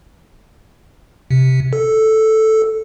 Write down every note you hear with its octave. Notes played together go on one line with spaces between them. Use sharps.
C3
A4